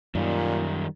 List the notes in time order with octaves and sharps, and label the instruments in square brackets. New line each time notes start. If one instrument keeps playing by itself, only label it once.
[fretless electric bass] F#2 [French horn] A#2 [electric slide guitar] D#3 G3